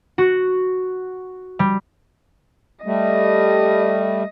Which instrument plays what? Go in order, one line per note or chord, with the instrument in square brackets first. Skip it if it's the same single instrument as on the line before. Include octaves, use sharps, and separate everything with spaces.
[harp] F#4
G3
[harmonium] G3 A3 [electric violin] D#5